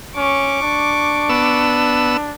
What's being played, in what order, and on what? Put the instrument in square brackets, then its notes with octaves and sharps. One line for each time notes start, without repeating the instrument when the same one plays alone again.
[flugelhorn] C#4 [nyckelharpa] C#6 D6
[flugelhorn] D4
[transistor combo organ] B3 E6